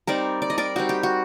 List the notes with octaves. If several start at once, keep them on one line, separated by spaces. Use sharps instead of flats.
G3 C4 D#4 A#4 D5
D5
D#5
A#4 D5
G3 C4 D#4 F#4
G4
F#4